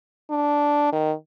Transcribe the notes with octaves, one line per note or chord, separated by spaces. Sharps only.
D4
D#3